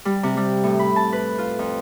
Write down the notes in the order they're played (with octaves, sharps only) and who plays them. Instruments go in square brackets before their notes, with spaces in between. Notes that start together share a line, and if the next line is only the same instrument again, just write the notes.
[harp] G3
C3
G3
A2
B5
A5
B4
F4
F2